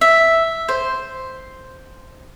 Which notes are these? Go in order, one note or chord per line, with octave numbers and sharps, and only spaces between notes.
E5
C5